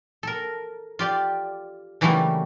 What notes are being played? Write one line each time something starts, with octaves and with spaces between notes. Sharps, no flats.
A4 A#4
F4 G4 D5
C#3 E3 F#3 G3 A3 A#3